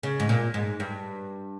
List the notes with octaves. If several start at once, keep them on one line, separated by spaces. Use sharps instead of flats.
C#3
G#2
A#2
G#2
G2